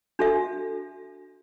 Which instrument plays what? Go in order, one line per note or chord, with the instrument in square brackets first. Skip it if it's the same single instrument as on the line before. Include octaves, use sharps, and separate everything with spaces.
[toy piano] D4 F#4 A4 E5